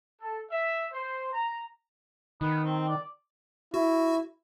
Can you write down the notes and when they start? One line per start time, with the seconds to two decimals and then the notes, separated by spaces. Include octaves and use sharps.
0.21 A4
0.51 E5
0.92 C5
1.33 A#5
2.41 D#3 B3
2.64 C4
2.88 D5
3.74 E4 F#4